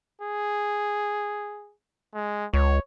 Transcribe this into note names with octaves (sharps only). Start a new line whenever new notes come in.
G#4
G#3
C#2 C#5